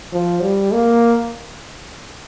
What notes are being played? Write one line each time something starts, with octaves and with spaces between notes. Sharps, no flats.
F3
G3
A#3